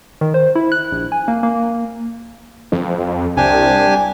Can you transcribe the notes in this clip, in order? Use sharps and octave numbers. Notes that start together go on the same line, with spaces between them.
D#3
C5
E4
F#6
A#1
G#5
A#3
A#3
F2
C2 D4 G4 G#5